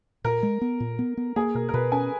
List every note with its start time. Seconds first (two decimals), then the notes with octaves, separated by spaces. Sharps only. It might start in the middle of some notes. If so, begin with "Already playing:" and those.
0.24 A#2 A#4
0.43 G#3
0.61 B3
0.80 A#2
0.99 B3
1.17 B3
1.36 A#3 G#4
1.55 B2 A#4
1.69 A#4
1.74 B2 B4
1.92 C#4 G#5